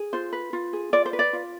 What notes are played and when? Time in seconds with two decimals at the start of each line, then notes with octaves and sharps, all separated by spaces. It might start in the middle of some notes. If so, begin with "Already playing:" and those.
Already playing: G#4
0.13 F4 C5
0.33 B4
0.53 F4
0.73 G#4
0.93 F4 D5
1.05 C5
1.13 B4
1.19 D5
1.33 F4